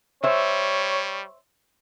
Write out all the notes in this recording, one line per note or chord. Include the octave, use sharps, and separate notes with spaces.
G3 C5 C#5 E5